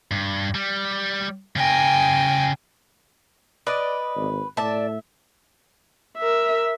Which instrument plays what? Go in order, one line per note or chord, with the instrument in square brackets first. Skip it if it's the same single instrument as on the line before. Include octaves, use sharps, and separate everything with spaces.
[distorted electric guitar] G2
G3
[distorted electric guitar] C#3 A#4 [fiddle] G5 G#5
[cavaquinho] B4 [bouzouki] D5 D#5
[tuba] G#1
[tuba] A2 [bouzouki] D5 A5 [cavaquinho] E5
[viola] A#4 E5